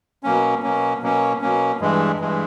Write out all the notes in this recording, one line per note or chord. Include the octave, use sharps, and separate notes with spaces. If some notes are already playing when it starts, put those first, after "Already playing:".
B2 F#3 A#3 C#4
B2 F#3 A#3 C#4
B2 F#3 A#3 C#4
B2 F#3 A#3 C#4
G2 E3 G#3
G2 E3 G#3